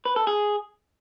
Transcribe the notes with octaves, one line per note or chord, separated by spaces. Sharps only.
B4
A4
G#4